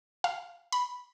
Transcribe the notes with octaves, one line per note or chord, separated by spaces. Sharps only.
F5
B5